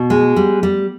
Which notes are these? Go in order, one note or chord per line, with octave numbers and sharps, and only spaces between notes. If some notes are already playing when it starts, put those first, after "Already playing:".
Already playing: B2
G#3
G3
G3